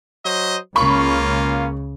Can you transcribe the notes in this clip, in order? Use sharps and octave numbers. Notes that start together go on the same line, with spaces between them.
F#3 C5 D#5
C#2 C#3 A#3 C#4 F4 B5 C#6